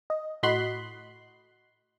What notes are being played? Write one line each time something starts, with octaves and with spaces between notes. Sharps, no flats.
D#5
A2 F#4 D#5 B5 C6 F#6